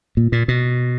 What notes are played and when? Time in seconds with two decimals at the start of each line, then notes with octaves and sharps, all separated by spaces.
0.17 A#2
0.32 A#2
0.48 B2